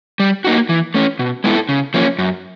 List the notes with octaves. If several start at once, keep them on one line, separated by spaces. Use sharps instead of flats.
G3
A#3 D#4 F#4
E3
A3 C#4
B2
G#3 B3 E4 A4
C#3
F3 A#3 C#4
F#2